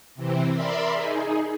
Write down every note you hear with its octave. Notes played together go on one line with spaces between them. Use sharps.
C3 E3 C4
A#4 D5 E5 B5 C6
D#4 G#4